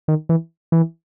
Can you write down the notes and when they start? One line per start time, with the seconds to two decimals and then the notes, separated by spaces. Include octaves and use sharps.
0.08 D#3
0.29 E3
0.72 E3